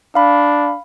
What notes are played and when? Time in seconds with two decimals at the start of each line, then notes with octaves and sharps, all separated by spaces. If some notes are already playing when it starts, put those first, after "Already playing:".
0.15 D4 F5 B5